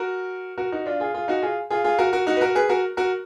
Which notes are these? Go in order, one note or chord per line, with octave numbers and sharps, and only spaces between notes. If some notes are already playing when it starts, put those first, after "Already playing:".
Already playing: F#4 A#4
F#4 A#4
D#4 F#4
D4 F4
F4 G#4
F4 G#4
D#4 F#4
F4 G#4
F4 G#4
F4 G#4
F#4 A#4
F#4 A#4
D#4 F#4
B4
F#4 A#4
G#4 B4
F#4 A#4
F#4 A#4